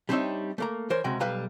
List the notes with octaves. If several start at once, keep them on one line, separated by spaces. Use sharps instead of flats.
G3 C4 D4 D#4 C#5 E5
A3 A#3 A#5
E3 A#4 C5 C#5
C#2 C3 G#3 F#4 G5
B1 G3 B4 F5 G5 A#5